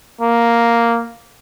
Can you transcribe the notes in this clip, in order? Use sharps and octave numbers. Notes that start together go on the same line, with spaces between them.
A#3